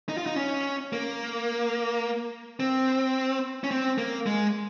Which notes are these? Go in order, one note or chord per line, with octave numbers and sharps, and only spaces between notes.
D#4
F4
D#4
C#4
A#3
C4
C#4
C4
A#3
G#3